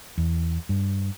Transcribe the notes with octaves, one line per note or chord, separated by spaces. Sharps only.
E2
G2